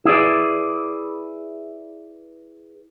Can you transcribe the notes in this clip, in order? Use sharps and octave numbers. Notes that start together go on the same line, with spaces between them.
E4 G#4 B4 D5